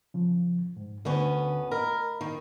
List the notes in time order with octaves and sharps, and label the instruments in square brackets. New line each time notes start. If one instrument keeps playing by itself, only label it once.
[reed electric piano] C#3 F3
G#2
[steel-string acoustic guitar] D2 B3 C#4 [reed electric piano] D3
[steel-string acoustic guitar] A#4 [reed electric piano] D#5 B5
[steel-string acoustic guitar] D#3